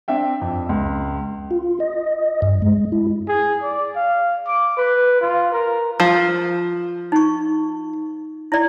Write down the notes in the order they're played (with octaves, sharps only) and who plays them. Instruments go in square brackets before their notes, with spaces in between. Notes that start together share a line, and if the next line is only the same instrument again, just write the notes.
[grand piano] C4 D4 E5 G5
F2
C#2
[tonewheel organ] F4
D#5
G2
G#3
E4
[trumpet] G#4
D5
F5
D6
B4
F4
A#4
[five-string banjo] F3
[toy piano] D#4 C#6
E4 D5